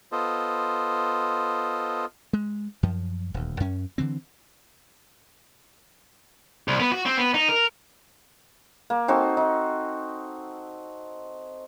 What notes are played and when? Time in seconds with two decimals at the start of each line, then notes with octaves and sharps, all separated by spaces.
0.12 B3 F4 A4 C5 D#5
2.33 G#3
2.83 F#2 F3
3.34 D#1 D2
3.60 F#2 C#4
3.98 D3 E3 C4
6.68 C2
6.80 B3
6.92 F#4
7.06 C4
7.18 B3
7.34 D#4
7.49 A#4
8.90 A#3
9.08 C4 D#4 F#4 A4
9.37 D#4